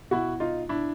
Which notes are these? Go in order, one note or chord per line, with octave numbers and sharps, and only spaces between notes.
B2 E4 F#4
D#4 F4
D4 E4